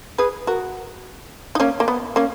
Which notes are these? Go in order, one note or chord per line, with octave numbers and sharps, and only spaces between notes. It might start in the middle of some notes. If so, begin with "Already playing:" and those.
G#4 B4
F#4 A#4
D#4
A#3 C#4
A#3
B3
A#3 C#4